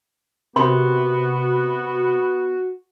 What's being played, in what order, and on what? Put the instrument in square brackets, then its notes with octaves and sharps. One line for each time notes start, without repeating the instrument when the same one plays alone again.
[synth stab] C3 [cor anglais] B3 [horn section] F#4 [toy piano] A#4 B5 C6